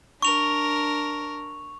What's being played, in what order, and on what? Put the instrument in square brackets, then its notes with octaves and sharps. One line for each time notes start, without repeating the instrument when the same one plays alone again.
[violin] D4 A#4 [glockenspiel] C#6 F7